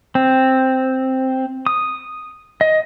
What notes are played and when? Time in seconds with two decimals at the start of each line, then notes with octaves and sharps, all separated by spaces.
0.15 C4
1.66 D#6
2.61 D#5